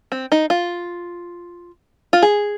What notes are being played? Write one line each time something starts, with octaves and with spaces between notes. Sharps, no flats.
C4
D#4
F4
F4
G#4